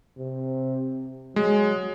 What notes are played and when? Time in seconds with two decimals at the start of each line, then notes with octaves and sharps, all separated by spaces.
0.18 C3
1.36 F#3 G#3